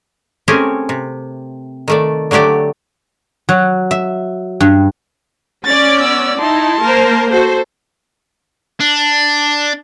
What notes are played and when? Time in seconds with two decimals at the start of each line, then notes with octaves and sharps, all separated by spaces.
0.48 A3 C4 C#4 G4 G#4 A#4
0.89 C3
1.88 D#3 A3 D5
2.31 D3 F#3 A3 G4 D5
3.49 F#3
3.91 E5
4.60 G2
5.65 C#4 D5 A6
5.97 B3 E6
6.40 D#4 E4 A5 C6
6.81 A#3 A#4 C5
7.30 F#4 A4 C5
8.80 D4